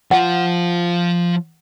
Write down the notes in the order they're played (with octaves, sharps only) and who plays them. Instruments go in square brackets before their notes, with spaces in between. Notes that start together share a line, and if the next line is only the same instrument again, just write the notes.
[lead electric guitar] F3 F4 [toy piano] F#5